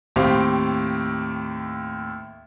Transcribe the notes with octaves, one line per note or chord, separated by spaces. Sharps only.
D#2 A2 C4 G4 F5